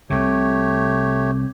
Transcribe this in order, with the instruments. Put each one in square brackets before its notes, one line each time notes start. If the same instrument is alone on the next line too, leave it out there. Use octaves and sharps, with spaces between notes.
[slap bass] C2 C3 [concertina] A3 G4 C#5